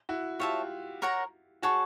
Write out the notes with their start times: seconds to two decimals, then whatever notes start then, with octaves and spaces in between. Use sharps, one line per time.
0.09 E4 F#4
0.39 F4 G4 C#5 E5 A5
1.02 A#4 C#5 F#5 A#5
1.62 F#4 G#4 C#5 F#5 A5 C#6